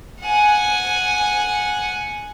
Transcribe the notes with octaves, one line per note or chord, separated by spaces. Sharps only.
F#5 G#5